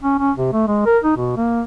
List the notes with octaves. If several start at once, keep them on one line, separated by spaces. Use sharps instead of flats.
C#4
C#4
C3
A3
G#3
A#4
D#4
B2
A#3